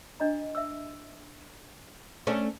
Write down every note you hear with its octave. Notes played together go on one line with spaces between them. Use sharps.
D4 D#5 A#5
E5 E6
A3 C#4 D4